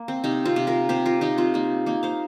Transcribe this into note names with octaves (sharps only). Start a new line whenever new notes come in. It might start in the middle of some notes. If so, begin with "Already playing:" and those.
Already playing: A#3
C4
C3 D#4
C4 F4
C3
F4 A#4
C3 G4 C5
F4 A#4
C3 D#4 G4
C4 F4
A#3 D#4
A#3 D#4
C5 F5